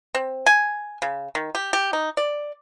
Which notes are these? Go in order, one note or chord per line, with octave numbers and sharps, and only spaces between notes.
C4
G#5
C#3
D#3
G4
G4
D#4
D5